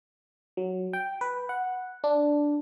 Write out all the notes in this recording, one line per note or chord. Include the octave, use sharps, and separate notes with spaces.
F#3
G5
B4
F#5
D4